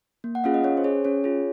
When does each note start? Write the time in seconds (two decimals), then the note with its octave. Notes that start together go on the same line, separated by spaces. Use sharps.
0.24 A#3
0.35 F#5
0.44 C#4 F4 G#4 F5
0.54 D#5
0.64 C#4 C#5
0.77 C5
0.84 G#4 C#5
1.05 C#4 C#5
1.24 F4 G#4